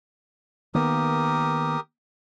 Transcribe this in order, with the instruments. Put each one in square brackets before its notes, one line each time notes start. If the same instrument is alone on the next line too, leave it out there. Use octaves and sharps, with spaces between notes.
[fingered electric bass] D#3 A#3 B3 [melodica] G4 A#4 D#6